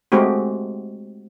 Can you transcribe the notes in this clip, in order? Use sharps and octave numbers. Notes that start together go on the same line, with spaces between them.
G#3 A3 C4 F#4 G4